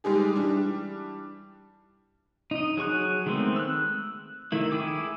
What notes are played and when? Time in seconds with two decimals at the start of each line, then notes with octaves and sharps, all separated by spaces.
0.04 G3 G#3 D#4 G4 G#4
0.36 E3 G3 D4
2.51 D#4 D#5
2.77 F#3 G#4 C#6 F#6
3.26 D#3 G#3 A3 B3 C4
3.56 E6 F#6
4.52 D#3 A3 E4
4.72 E4 G#4 G5 D6